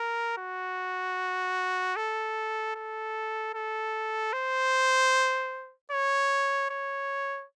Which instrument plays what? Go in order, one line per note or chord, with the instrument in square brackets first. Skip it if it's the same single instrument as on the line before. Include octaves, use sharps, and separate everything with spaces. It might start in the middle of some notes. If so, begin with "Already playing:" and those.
Already playing: [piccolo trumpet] A#4
F#4
A4
A4
A4
C5
C#5
C#5